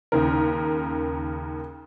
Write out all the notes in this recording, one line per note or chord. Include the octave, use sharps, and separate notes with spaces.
D#2 C#3 A#4